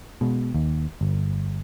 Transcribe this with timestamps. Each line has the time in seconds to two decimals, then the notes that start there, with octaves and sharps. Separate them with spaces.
0.21 B2 G#3
0.54 D#2
1.01 G1